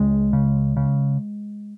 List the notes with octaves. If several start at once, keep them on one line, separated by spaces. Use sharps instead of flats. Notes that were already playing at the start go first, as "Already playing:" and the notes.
Already playing: C#2 C#3 G#3
C#3
C#3